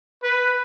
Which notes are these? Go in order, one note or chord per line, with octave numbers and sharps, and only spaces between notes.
B4